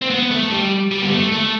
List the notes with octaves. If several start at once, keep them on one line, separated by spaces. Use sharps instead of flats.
C4
B3
A3
G3
G3
B3
A3
A3